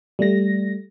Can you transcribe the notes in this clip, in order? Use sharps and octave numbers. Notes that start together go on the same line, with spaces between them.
G3 A3 A#6